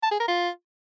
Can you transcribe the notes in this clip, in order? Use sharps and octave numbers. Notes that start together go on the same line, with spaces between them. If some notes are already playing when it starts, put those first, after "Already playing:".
A5
G#4
A#4
F4